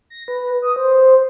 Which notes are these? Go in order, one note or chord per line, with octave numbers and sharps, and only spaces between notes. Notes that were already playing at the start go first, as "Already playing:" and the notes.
A#6
B4
D#6
C5